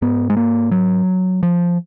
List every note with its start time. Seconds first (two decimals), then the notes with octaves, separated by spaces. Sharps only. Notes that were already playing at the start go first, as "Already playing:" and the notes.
0.02 G#2 B3
0.30 G#3
0.37 A#3
0.71 F#3
1.43 F3